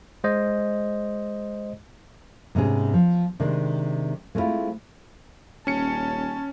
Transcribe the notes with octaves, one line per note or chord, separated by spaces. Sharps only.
G#3 C5 D#5
G#2 C3 B3 C#4 G#4
F3
C3 D#3 G#3 D4
G#3 A3 C4 C#4 E4 F4
D#1 C#4 A5 C#7